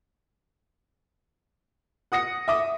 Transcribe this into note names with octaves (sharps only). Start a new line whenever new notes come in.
F#5 D#6 A#6 C#7
E5 D6 D#6